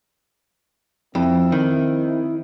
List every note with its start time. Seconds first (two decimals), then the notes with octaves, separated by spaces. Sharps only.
1.15 F2 C4 E4
1.52 D#3